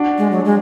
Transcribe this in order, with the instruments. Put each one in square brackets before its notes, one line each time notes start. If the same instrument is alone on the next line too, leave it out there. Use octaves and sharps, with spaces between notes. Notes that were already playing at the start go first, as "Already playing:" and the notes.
Already playing: [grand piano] D4 F#4
[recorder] G#3
F#3
G#3